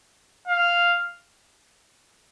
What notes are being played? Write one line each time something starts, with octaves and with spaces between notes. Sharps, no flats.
F5